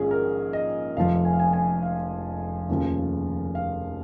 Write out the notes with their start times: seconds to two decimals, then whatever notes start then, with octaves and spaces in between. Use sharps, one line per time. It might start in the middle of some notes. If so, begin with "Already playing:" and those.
Already playing: A#1 G#2 D#3 C#4 G#4
0.11 A#4
0.53 D#5
0.97 F1 F2 F3 F5
1.25 G#5
1.33 F5
1.39 G#5
1.53 G#5
1.83 F5
2.69 F1 D#2 C#3 F3
3.55 F5